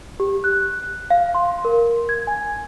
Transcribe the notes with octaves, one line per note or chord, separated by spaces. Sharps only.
G4
F#6
F5
C6
A#4
G#6
G#5